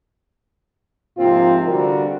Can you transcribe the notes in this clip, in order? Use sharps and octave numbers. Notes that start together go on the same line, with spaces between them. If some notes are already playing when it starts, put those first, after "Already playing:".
G#2 C3 F3 A#3 C4 F4
D3 G3 D4 F#4 A#4